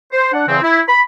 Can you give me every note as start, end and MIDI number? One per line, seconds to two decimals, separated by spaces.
0.12 0.32 72
0.33 0.43 62
0.33 0.43 78
0.48 0.58 40
0.48 0.58 49
0.48 0.58 52
0.48 0.58 60
0.62 0.80 64
0.88 1.01 83